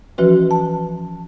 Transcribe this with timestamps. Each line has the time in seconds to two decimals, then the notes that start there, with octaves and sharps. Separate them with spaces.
0.18 E3 F3 C#4 F#4 B4
0.51 A5